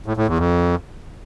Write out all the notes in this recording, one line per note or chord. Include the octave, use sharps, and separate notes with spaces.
A2
A2
E2
F2